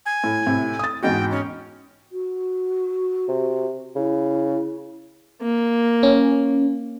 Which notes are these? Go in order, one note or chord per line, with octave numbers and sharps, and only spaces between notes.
G#5
A2
A2 C3
D#6 A6
E2 G#2 F#4 G5
C#4
F#4
C3
C#3 E4
A#3
C#4